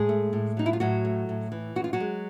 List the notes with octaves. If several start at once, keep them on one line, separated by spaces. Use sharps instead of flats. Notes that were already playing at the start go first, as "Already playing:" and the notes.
Already playing: A2 G#3 G#4
A3
A2
F#3 D#4
E4
F4
A2 F#3 F#4
A3
A2
E3
F#2 F#4
F4
F#3 F#4
G#3